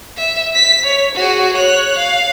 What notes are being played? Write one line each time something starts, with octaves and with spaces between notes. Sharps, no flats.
E5
B6
C#5
F#4 G#4
C#5 F#6
F5